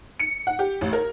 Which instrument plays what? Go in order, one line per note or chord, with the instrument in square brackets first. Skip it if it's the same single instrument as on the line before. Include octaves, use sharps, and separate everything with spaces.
[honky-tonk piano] C#7
F#5
G4
A1
A#4